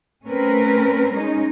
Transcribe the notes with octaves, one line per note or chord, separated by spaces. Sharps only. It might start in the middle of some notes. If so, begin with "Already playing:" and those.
A3 C4 C#4 A#4 B4
G#3 C#4 D#4